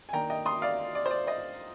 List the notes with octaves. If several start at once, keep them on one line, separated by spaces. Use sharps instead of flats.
G#5
D#3 A#3 D4 G5 A#5
D#5 G5
C6 D#6
D5 F5
D5
C5
D5
C5 D#5